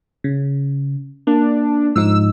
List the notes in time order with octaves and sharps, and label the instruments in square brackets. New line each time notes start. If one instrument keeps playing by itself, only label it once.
[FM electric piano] C#3
[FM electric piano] A#3 [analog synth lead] D4
[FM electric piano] G#2 F3 D#4 [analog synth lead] E6